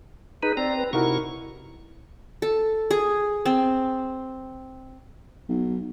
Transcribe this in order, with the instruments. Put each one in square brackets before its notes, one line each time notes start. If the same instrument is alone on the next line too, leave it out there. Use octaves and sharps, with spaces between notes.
[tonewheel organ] D#4 B4 [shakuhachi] G#4
[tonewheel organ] C4 A#5 [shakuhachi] D5
[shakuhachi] B4
[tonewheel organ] C3 C#6 [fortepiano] D#4 F#4 A#4 [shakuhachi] E4
[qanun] A4
G#4
C4
[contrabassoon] B1